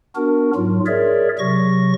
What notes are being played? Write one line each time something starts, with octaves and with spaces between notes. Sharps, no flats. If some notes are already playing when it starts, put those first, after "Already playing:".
B3 D4 F#4 A#4
G#2 F#3 F4
G#4 A#4 C#5 D5 E5
C3 F#3 C#6 A#6